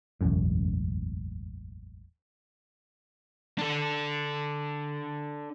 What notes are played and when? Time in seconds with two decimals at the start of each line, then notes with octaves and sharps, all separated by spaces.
0.21 E1 A1 F#2 A2
3.58 D4 A4